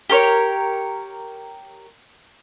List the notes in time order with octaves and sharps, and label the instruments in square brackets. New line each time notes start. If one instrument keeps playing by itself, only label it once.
[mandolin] G4 A#4 C#5